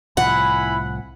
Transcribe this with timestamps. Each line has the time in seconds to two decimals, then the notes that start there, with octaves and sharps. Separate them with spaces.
0.17 C2 A2 F3 E4 F#5 G#5 B5